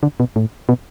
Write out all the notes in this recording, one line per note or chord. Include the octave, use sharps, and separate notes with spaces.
D3
B2
A2
B2